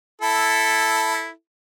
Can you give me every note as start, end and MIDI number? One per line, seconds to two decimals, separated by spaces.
0.21 1.30 64
0.21 1.30 69